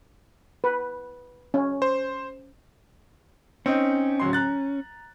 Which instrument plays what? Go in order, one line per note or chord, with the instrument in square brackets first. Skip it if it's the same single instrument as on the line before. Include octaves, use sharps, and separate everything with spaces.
[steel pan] B4
C#4
[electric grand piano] C5
[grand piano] C4 D#4 [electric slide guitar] C#4
[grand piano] D1 F#3 C6
A#5 F#6 A6